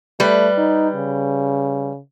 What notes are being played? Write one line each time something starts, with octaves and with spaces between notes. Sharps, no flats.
G3 A3 B4
D#4
C#3